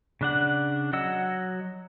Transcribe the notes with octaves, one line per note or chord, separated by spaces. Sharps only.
C#3 D4 F#5
F#3 D#5 F#5 E6